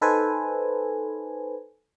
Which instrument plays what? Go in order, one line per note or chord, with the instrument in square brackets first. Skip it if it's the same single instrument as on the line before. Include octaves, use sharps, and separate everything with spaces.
[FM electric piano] D#4 A4 B4 C5 G#5